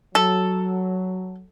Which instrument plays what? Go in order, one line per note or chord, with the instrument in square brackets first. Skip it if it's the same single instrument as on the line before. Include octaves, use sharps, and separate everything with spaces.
[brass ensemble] F#3 [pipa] A4